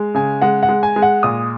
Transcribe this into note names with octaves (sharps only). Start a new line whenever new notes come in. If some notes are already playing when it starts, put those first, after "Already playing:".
Already playing: G#3
C#3 G#5
G#3 F#5
F#5
G#3
G#5
G#3
F#5
A#2 D#6